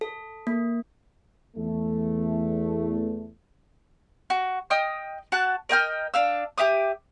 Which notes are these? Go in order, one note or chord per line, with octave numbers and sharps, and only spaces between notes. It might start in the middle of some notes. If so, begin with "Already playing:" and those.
A4
A#3
E2 A3
F#4
D#5 G5 D#6 F6
F#4 A5 F#6
A#4 D#5 G5 F6
D4 F5 E6
G4 E5 D6 D#6